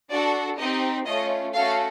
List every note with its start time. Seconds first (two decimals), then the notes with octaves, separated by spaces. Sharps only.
0.10 D4 F#4 A4 D5
0.59 C4 D#4 G4 D#5
1.06 A3 C#4 F4 D#5
1.54 A3 C#4 F#4 A4 F5